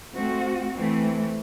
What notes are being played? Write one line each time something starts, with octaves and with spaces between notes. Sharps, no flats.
A3 C4 F#4
E3 A3 C4